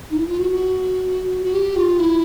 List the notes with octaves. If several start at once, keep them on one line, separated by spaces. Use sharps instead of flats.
D#4
E4
F4
F#4
F#4
F#4
G4
F4
E4